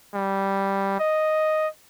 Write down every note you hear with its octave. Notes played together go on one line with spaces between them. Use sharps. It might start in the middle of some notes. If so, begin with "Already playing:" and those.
G3
D#5